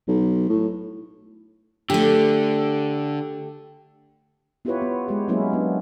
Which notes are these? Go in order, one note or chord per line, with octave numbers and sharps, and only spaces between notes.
B1
A2
D3 A3 G4
B3 E4 F4 G4 B4 C#5
B3
G#3 G4
F#3 G#3 A#3 B3 C#4 E4
B3 D4